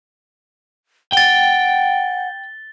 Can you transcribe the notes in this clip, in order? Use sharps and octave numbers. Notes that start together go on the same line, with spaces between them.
F#5 G5 A6 G7